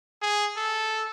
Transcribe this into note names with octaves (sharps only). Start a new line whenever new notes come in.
G#4
A4